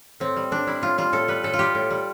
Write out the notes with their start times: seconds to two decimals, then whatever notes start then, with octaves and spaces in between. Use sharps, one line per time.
0.20 A2 C4
0.36 G3
0.51 A2 D4
0.67 G3 E4
0.82 A2 F4
0.98 G3 F4
1.12 A2 A4
1.28 G3 B4
1.43 A2 A4
1.53 F4
1.59 G3 G4
1.75 A2
1.90 G3